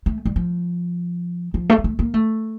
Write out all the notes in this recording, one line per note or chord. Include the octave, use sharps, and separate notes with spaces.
A3
G3
F3
F3
A3
A#3
A3
A#3
A3